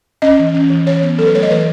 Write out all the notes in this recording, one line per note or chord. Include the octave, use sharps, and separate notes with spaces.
C#4 D#5
E3
C#4
E3
E3 C#5
B3
F#3 A4
B4
A3 C#5
D#5
E3 B4